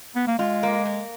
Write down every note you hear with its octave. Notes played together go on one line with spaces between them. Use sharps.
B3
A#3
G#3 F4
A#3
A#3